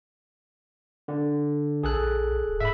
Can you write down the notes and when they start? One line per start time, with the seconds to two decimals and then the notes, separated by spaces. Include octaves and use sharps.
1.08 D3
1.83 A#1 G#4 A4 F#6
2.47 D#1
2.60 G#2 E5 B5